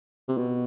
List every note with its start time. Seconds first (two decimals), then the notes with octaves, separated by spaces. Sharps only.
0.28 C3
0.37 B2